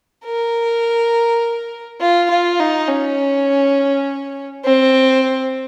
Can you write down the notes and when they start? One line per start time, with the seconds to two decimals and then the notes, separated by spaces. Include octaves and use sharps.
0.25 A#4
2.01 F4
2.31 F4
2.60 D#4
2.88 C#4
4.65 C4